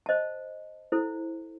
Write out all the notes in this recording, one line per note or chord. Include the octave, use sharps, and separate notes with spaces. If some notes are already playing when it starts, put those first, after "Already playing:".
C5 D#5 A5
E4 A4 C5